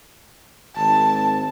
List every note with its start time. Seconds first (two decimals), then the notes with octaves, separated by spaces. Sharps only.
0.76 G#1 A5